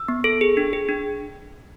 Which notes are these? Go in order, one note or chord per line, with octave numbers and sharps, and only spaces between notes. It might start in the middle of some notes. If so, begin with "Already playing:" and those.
Already playing: E6
B3
A4
G#4
D4
G#4
D4